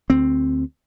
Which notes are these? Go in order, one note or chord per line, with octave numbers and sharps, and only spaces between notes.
D2 C4